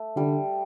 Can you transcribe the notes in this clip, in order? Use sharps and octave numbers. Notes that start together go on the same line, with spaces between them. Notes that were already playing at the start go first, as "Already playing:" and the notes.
Already playing: A3
D3 G3